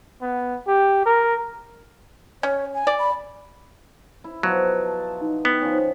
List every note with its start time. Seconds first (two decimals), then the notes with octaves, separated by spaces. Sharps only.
0.22 B3
0.67 G4
1.05 A#4
2.43 C#4 C#5
2.74 G#5
2.87 D5
2.99 B5
4.24 E4
4.43 B2 F3 F#3
4.82 A5
5.21 D#4
5.45 B3 G5
5.61 F3 C#4